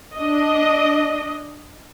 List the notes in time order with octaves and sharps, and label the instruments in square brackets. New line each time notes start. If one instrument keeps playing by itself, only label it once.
[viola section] D4 D#5